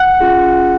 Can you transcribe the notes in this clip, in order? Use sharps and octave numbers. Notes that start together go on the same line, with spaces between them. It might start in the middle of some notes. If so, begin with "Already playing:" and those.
Already playing: F#5 F#6
C#4 F4 G#4